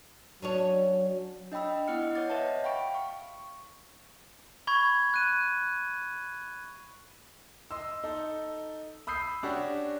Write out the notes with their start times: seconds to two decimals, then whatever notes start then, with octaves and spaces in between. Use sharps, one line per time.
0.42 F#3 C#4 D4 C#5
1.52 D4 D#5 G5 B5 E6
1.88 B3 E4 D#5 F#5 F6 C#7
2.15 C#5 F#5 D6 A6
2.30 B4 C#5 D#5 E5 F#5 A5
2.64 F5 G5 B5 C#6 D7
2.94 F5 C#6
4.67 B5 C#6 G#6
5.14 F#6 D#7
7.71 D#5 C6 E6
8.04 D#4 A4
9.07 B5 D#6 E6 G6 C7
9.43 C#4 D4 F#4 G4